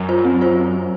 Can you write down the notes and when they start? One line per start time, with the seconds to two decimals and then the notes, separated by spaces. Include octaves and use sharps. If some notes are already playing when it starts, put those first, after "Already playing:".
Already playing: F#2
0.09 F4 C5
0.25 C4
0.41 F4 C5